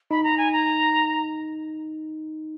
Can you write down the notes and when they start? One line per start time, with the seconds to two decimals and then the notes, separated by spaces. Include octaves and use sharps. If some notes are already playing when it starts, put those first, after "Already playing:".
0.11 D#4 B5
0.23 A#5
0.38 G#5
0.52 A#5